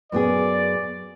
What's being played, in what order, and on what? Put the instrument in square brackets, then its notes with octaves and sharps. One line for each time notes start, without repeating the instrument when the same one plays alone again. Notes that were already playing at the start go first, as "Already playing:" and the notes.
[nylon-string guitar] F#2 B3 G#4 [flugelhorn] D5